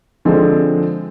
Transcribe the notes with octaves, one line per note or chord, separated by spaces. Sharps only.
D3 F3 G#3 C4